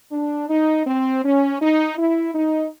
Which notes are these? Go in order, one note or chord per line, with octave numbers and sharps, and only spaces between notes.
D4
D#4
C4
C#4
D#4
E4
D#4